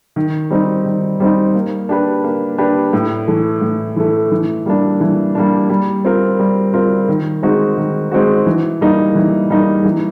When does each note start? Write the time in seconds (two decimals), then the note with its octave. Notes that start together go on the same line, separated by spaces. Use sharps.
0.16 D#3
0.50 G3 C4 D#4
0.85 D#3
1.20 G3 C4 D#4
1.55 A#3
1.89 D4 G4 B4
2.24 A#3
2.58 D4 G4 B4
2.93 A2
3.28 E3 A3
3.62 A2
3.96 E3 A3
4.31 E3
4.66 G3 A#3 D4
5.00 E3
5.35 G3 A#3 D4
5.70 G3
6.05 C4 F4 A#4
6.39 G3
6.74 C4 F4 A#4
7.08 D#3
7.43 G#3 C4 D#4 F#4
7.77 D#3
8.12 G#3 C4 D#4 F#4
8.46 E3
8.81 G3 A#3 D#4
9.15 E3
9.50 G3 A#3 D#4
9.85 E3